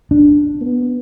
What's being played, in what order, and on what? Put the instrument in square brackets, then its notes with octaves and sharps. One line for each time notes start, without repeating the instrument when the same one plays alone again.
[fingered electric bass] D4
[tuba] B3